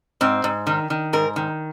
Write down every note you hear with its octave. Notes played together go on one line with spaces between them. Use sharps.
G#2 C4
G#2
D#3
D#3
G#2 A#4
D#3